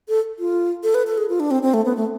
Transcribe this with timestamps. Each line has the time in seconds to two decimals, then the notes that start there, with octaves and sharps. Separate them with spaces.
0.09 A4
0.39 F4
0.83 A4
0.95 B4
1.07 A4
1.18 G#4
1.29 F4
1.40 D4
1.51 C4
1.63 C4
1.74 A3
1.85 B3
1.97 A3